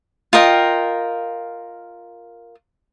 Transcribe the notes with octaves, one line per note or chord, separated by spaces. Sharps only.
F4 A#4 D#5 G5